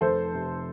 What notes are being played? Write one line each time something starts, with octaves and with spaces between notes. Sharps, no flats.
F1 A4 C5
C3